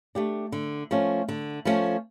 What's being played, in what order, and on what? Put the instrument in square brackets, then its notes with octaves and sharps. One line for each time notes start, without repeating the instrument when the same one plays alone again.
[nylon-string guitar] A3 D4 G4
D3
F3 A3 C#4
D3
F3 A3 C#4